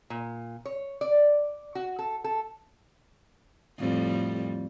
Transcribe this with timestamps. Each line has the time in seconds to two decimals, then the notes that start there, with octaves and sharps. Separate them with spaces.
0.10 A#2
0.66 C#5
1.01 D5
1.75 F#4
1.99 A4
2.24 A4
3.79 F2 A2 G3